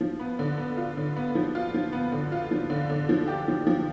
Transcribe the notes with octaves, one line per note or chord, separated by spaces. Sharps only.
F3
B3
D3
B3
F4
D3
B3
F3
F4
F3
B3
D3
F4
F3
D3
D3
F3
G4
F3
F3